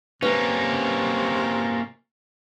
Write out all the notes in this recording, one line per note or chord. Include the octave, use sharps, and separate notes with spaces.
C3 A#3 C#4 B4 E5